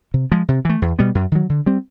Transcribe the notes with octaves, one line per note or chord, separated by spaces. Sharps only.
C3
F3 G#3
C3
E3 A3
E2
B2 G3 B3
F#2
D#3 F#3
D3
G3 C4